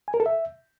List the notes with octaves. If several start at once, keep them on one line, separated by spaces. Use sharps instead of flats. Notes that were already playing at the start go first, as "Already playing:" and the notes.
G#5
A#4
A4
E5